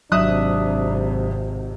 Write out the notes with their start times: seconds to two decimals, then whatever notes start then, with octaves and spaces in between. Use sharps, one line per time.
0.12 G#1 C3 F#3 D4 E5 D#6 F#6